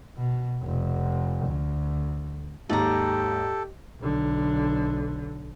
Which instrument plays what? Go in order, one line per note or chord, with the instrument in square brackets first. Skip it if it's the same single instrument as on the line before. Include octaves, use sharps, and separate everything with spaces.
[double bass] B2
F1
D2
[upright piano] D#2 G#2 [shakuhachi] G4 [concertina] A4 [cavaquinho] D5 A#5
[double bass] B1 D3